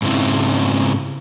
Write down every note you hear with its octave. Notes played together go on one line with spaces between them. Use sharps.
G#2 C#3 C4 E4